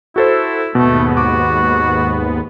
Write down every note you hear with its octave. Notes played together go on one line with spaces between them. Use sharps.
E4 F#4 A4 C5
D#2 G#2 B2 A3 B3
F#4 D6